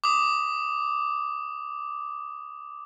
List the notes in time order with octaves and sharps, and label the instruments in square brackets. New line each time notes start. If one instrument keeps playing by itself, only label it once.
[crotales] D6 D#6